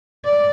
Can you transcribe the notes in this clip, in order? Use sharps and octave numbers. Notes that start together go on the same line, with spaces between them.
D5